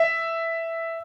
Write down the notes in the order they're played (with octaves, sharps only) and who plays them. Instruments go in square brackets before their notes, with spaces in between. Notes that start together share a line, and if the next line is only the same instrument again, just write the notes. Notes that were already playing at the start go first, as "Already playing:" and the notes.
Already playing: [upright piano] E5